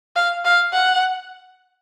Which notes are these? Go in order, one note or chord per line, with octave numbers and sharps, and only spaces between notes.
F5
F5
F#5